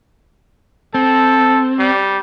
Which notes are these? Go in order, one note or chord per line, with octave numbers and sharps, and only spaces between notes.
C4 A4
G3